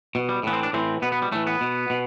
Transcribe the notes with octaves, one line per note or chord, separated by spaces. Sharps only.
B2
G3
A2 E3 B3
C4
D4
A2 E3 C4
B2 B3
B3
G3
A2 E3 A3
B3
B2
B2